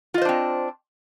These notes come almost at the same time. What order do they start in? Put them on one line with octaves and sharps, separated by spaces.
F4 D#5 C5 D4 C4